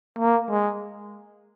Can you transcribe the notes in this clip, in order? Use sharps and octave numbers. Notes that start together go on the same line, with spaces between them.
A#3
G#3